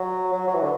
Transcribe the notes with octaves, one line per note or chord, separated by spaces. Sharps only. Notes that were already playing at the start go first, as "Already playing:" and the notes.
Already playing: F#3
F#3
F#3
E3
D3